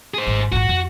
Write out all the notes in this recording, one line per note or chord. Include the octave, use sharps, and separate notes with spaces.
G#4 C5
G#1
G#1 F4 F#4
F2